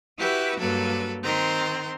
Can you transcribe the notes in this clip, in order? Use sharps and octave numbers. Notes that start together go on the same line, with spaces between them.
E4 F#4 G4 B4 E5
G2 F#3 A#3 A4 B4
D#3 C4 A#5 C6